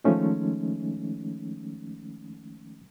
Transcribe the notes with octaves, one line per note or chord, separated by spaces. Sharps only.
D#3 F3 G#3 A3 C#4 D#4